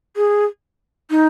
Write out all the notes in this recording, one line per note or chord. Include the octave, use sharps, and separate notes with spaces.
G#4
D#4